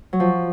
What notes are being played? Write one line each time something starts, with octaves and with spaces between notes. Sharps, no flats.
F#3
F3